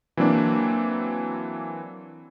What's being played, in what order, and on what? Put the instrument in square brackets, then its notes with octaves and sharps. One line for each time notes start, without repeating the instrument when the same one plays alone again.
[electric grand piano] E3 F#3 A#3 C4 D4